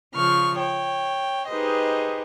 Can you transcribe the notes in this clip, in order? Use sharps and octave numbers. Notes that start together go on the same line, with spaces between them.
C#3 F3 C#6 F6
C#5 G5
D#4 G4 G#4 B4 C5 D#5